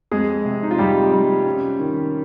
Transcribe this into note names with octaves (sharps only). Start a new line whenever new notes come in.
F2 G#3 G#4
C3
D#4
F4
F2 G3 G4
G3
C#4
D#3